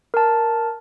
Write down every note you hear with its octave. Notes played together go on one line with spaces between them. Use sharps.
A#4 A5